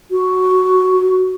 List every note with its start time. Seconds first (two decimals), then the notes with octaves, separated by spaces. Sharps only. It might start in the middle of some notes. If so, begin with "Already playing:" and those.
0.11 F#4